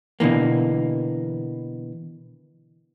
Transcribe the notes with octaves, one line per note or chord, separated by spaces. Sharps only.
B2 D3 E3 A#3